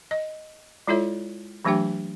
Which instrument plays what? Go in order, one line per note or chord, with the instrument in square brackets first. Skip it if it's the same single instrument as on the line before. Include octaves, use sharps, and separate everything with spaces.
[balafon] D#5
G#3 E4 F4 A4 C#5 E5
E3 F#3 A3 D4 G4 G5